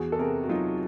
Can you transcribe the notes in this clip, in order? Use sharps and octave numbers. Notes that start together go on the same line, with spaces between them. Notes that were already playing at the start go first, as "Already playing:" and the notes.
Already playing: E2 F#4 G#4
A4
C3 G#4 A#4
F#4
F#3 D#4 F4